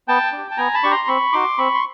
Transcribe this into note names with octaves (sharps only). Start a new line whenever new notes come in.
B3 G5 A5
D4
G4
A5
B3 G#5 A#5
A5 B5
D4 G4 C#6
A#5 C6
C4 B5 C#6
D#4 F#4 C6 D6
C4 B5 C#6
C6